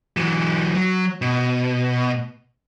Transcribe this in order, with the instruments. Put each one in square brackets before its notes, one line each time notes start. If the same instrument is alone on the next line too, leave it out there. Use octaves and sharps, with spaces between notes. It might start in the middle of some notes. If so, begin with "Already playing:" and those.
[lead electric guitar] E3 F#3
F#3
B2